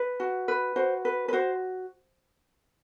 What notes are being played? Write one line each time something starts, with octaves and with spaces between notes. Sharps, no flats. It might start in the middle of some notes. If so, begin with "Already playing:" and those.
Already playing: B4
F#4
B4
F#4 C5
B4
B4
F#4 C5